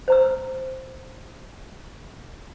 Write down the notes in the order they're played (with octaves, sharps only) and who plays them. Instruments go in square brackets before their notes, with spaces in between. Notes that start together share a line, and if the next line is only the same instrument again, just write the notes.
[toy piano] C5 A#5 E6